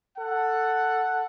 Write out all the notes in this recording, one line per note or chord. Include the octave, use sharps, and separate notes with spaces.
A4 F#5